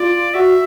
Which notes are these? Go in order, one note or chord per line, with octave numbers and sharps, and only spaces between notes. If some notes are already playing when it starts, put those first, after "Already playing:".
Already playing: F4 D5
F#4 E5